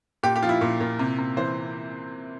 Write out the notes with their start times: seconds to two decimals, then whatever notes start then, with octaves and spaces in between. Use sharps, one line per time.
0.23 A#2 G4
0.36 G4
0.42 F3 F4
0.49 E4
0.61 A#2
0.80 A#2
0.99 C3
1.18 C3
1.37 E3 C5